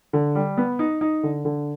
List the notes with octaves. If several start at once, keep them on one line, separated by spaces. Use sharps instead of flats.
D3
G3
B3
D#4
D#4
D3
D3